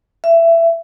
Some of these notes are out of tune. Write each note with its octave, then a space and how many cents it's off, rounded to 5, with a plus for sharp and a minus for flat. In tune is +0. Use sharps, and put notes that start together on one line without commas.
E5 +20